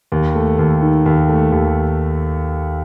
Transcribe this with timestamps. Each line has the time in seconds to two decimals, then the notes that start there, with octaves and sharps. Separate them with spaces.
0.12 D#2
0.35 A3
0.59 D#2
0.82 D#3
1.06 D#2
1.29 A3
1.52 D#2